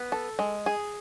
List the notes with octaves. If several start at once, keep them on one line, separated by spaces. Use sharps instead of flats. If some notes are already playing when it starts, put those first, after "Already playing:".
Already playing: B3
A4
G#3
G#4